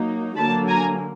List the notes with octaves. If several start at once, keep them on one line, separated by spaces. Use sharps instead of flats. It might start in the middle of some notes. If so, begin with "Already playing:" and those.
Already playing: F#3 A#3 D#4
D3 F#3 A#3 A5 B5
G#5 A#5